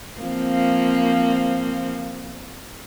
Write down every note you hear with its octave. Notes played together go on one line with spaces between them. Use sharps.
F3 A#3 C4